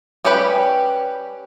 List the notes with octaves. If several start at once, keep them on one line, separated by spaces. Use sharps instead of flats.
G3 C#4 G4 B4